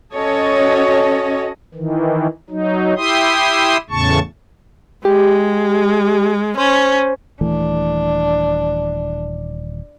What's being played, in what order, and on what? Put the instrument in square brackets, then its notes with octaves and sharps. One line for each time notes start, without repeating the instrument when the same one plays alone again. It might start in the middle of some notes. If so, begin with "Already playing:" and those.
[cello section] C#4 F#4 A4 C#5 D#5
[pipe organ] D#3 E3
F#3 D#4
E4 G4 E5 C6 D#6
E2 A2 C#3 A5 C#6
[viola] G#3 [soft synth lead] G4
[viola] C#4 [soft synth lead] C5
[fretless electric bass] D#1 E3 A3 [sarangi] D4